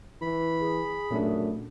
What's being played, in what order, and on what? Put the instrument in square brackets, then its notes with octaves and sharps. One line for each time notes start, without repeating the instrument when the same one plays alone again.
[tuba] E3 [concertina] B5
[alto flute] G#4
[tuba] F#2 [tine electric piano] A#2 A3 D4